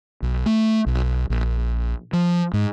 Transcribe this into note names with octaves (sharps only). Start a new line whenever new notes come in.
B1
A3
B1
A#1
F3
G#2